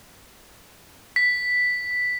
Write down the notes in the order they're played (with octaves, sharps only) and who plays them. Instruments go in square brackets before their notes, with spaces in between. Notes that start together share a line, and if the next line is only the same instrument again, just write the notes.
[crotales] B6